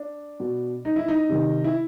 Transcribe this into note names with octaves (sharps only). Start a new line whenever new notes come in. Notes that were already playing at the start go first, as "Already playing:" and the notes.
Already playing: D4
B2
D#4
E4
D#4
C3 D#3
E4